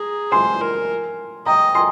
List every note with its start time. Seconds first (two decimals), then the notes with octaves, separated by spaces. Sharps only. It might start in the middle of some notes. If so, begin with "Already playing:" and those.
Already playing: G#4 A#5
0.31 C5 G#5 C6
0.61 A#4
1.46 D#5 G5 A#5
1.75 G#5 C6